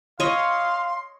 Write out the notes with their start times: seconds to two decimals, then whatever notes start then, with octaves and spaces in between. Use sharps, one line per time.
0.20 C#5 D#5 F5 C6